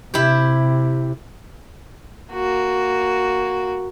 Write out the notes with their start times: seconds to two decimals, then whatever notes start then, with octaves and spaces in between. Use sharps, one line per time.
0.14 C3 E4 G4
2.33 A#3 F#4